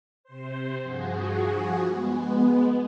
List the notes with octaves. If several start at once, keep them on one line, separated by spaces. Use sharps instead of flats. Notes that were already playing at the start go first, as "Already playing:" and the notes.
C3 C5
G2 F3 F#4 G#4
G#3 B3